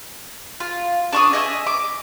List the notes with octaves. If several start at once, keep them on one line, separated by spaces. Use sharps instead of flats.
F4
D4 C#6 D#6
D#5 E5 G#5
D6